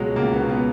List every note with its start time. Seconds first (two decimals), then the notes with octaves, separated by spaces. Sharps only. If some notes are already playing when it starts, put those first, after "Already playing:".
Already playing: C#2 B2 F#3 G#3
0.16 C#2 A#3
0.33 B3
0.41 B2
0.49 B3